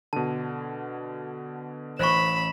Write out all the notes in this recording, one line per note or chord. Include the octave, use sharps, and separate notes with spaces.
B2 D3 A5
A1 E3 C5 B5 C#6 E7